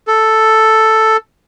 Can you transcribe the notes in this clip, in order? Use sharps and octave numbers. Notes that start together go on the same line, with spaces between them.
A4